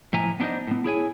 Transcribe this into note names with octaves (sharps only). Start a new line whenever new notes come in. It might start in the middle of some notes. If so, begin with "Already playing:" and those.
A2 F3 E5 G#5 A#5
B3 D4 D#4 G4 C5 D#5
A2 B3
E4 G#4 C#5 G#5